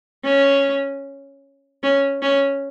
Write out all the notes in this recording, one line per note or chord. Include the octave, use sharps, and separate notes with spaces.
C#4
C#4
C#4